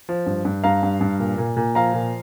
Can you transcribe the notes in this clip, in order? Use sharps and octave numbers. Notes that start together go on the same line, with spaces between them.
F3
G2
G2
G2 F5 A#5
G2
G2
A#2
A#2
A#2
F3 F5 A#5
A#2